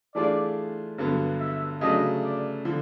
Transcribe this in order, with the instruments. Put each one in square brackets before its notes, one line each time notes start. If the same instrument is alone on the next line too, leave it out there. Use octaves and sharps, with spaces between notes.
[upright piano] E3 A3 D4 F4 G#4 [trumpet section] D5
[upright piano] G2 D3 F#3 B3
[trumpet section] E5
[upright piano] C#3 F#3 A3 D4 [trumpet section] D#5
[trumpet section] D5
[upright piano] D3 F3